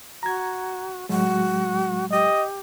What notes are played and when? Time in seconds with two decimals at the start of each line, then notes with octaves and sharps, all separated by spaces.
0.23 F#4 A#5 G#6
1.09 A2 F#3 G#3 F#4
2.12 G4 D#5